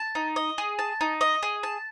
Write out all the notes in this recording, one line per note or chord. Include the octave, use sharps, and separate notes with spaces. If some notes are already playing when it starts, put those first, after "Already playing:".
Already playing: A5
D#4
D#5
G#4
A5
D#4
D#5
G#4
A5